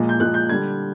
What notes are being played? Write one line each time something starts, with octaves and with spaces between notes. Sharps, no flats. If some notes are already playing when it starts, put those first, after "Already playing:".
Already playing: A#2 F3 G#3
G6
A#2 F3 G#3 F#6
G6
D3 G3 G#6